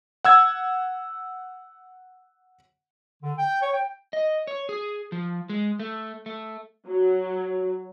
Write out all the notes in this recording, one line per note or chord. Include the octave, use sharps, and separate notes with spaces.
F#5 E6 G#6
D3
G5
C#5
G5
D#5
C#5
G#4
F3
G#3
A3
A3
F#3